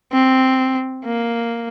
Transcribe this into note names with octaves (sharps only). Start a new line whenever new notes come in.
C4
A#3